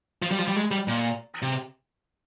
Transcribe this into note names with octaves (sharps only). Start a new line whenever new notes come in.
F3
G3
F3
G3
G#3
G3
A#2
C3